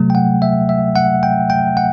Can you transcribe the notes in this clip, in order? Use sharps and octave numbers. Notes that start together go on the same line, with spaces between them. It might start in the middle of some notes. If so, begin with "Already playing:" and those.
Already playing: C3 F#3 A3
G5
F#5
E5
E5
F#5
G5
G5
F#5